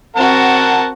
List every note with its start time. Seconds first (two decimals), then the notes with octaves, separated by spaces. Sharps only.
0.17 C4 F#4 A#4 F#5 A5